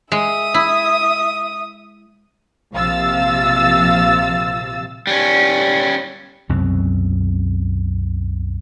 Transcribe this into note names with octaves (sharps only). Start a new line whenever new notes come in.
G#3 E5 D#6
E4
A#1 C3 F3 F5 E6 A6
G3 C#4
C2 F#2 B2 C4